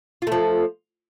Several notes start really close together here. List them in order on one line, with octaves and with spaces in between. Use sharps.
F4 A3 F3